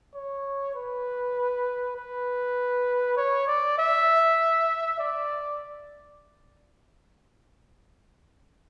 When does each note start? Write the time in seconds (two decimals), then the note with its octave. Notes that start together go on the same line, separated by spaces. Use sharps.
0.15 C#5
0.75 B4
1.97 B4
3.17 C#5
3.47 D5
3.78 E5
4.99 D5